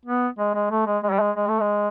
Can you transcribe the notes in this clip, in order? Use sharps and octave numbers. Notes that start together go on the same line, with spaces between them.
B3
G#3
G#3
A3
G#3
G#3
G3
G#3
G#3
A3
G#3